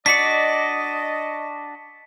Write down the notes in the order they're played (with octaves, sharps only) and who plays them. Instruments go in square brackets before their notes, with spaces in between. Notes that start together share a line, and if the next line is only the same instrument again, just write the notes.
[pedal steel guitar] D4 F#4 D5 [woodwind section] D#5 [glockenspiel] B6 C#7